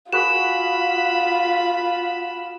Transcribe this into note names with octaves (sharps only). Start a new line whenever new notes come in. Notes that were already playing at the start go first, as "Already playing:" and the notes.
F4 F#4 G#4 B4 B5 E7